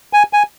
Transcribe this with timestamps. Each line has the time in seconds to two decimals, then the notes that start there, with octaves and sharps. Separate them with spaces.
0.13 G#5
0.33 G#5